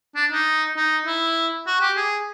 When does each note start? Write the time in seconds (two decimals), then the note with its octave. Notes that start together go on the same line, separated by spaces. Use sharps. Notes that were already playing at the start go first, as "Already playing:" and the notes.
0.16 D4
0.32 D#4
0.76 D#4
1.06 E4
1.67 F#4
1.81 G4
1.97 G#4